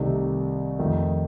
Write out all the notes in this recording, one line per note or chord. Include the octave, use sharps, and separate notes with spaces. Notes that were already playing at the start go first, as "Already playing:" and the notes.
Already playing: C2 C3 D#3 A3 D#4
F2 D#3 A3